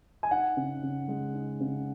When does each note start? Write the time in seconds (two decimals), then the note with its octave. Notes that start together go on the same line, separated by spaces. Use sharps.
0.23 G#5
0.31 D#4 F#5
0.57 C#3
0.83 C#3
1.08 G#3
1.34 D#4
1.60 C#3